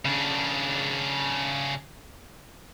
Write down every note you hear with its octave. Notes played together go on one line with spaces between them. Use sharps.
C#3 D4